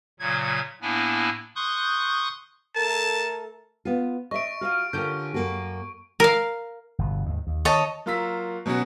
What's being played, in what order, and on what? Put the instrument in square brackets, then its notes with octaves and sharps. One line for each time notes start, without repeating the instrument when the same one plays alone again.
[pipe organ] A#2 C#3 F#3 G#6
A2 A#3 B3 D4 E4 G#5
C6 C#6 D#6 F#6 G6
[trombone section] A3 A4 A#4 [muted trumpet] A5
[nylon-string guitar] B3 F4
[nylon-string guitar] D#5 E5 [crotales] C#6 D7
[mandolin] F4 F6 [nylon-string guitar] F#4 F5
[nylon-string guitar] D3 F4 A#4 [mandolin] C#4 G4 G6
[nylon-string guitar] F#2 A#3 F#4
[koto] A#4 F5
[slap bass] G1 B2
D#2 G#2
D#2
[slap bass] D#3 [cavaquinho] C#5 D#5 A5
[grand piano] F#3 A#3 F4 A#5 E6 B6
B2 F#3 B3 C#4 F#4